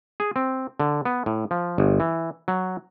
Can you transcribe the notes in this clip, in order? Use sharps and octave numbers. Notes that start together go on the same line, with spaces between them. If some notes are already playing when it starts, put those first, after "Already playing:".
G#4
C4
D3
B3
A2
F3
G1
E3
F#3